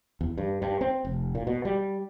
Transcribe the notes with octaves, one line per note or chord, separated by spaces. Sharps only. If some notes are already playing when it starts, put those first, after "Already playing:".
E2
G2
G2
C4
F1
A#2
B2
G3